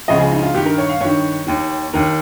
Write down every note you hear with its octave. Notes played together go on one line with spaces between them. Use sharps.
C#2 C#3 F3 D#5
G#4
D#4
F4
G2 D#3 G4
A#4
C#5
F5
G2 D#3 C#5
D#2 D#3
D#2 D#3 A#4